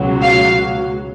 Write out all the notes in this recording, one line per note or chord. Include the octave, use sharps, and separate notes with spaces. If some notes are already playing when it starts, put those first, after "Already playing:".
Already playing: C#2 B2 F#3
F5